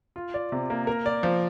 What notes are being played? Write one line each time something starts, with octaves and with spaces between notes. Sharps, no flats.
F4
D5
C3
A#3
A#4
D5
F3